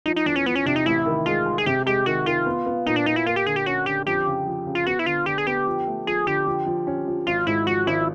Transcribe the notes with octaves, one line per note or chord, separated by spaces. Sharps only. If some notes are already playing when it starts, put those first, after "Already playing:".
F3 D#4
D#4
E2 D4
C#4
F3 B3
C#4
C3 D4
D#4
A1 E4
D#3
G#3 F4
G#3
G#4
C3 G4
G#3 G4
D#3 F#4
D#3 F4
B3
B3
A#2 D#4
D4
A#2 D#4
E4
A#3 F4
G4
D3 G#4
G4
C#4 F#4
D3 G4
F2 G4
C#3
F3
C#3
F4
B3 F#4
E4
D3 F4
D3 G4
G#4
B3 G4
F3
A3
F3 G#4
D3 G4
F3
F3
C#4
F3
G#1 F4
G#2 E4
F3 F#4
G#1 E4